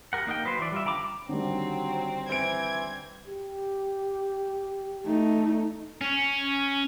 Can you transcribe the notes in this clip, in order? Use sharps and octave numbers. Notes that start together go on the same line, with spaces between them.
G4 A#4 F#5
A#3 D#4 A#4 G5
F#3 B4 C5
E3 D5
G3 F4 E5
D3 G5 A#5 B5 D6
D3 D#3 F#3 G3 C4
E3 C4 G#6 D7
G4
A3 D#4
C#4